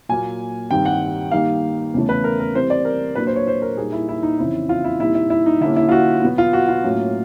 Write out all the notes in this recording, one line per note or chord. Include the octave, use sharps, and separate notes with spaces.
A#2 F#3 A#3 G#5
G2 D#3 G3 C4 D#4 G5
F#5
D#3 G3 A#3 D#4 F5
E2 C#3 E3 A3
B4
A#4
A#4
C3 E3 G3 C4 C5
D5
A#4
A#2 F#3 A#3 D4 B4
C5
C#5
C5
A#4
A#2 G3 A#3 D#4 G#4
E4
E4
D#4
F2 C#3 E3 E4
F4
E4
A#2 G3 C4 D#4 E4
E4
E4
D#4
D3 G3 A#3 C#4 E4
E4
F4
F#4
B2 F#3 B3
F4
F#4
F4
A2 F#3 A#3 C#4